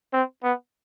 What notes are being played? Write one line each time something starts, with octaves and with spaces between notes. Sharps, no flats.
C4
B3